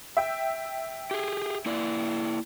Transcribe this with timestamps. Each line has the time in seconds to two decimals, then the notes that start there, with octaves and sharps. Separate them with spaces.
0.17 E5 G5
1.11 G4 G#4
1.66 A#3 E4 D5